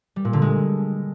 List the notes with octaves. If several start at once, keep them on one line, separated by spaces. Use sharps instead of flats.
G3
A#2
D3
G#3